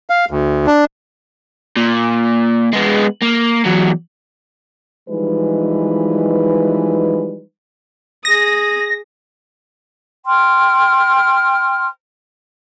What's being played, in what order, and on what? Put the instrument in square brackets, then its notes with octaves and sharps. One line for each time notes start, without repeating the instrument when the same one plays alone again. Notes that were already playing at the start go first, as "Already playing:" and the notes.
[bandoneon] F5
D2
D4
[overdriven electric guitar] A#2
G#3 B3
A#3
E2 F#3
[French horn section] E3 F3 G3 G#3 D#4 B4
[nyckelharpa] G#4 D#6 [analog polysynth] A#6
[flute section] G5 C6 F6